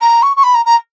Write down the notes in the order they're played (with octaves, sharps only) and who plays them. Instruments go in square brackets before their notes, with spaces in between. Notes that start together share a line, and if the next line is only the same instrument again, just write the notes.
[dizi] A#5
C#6
C#6
B5
A#5
A#5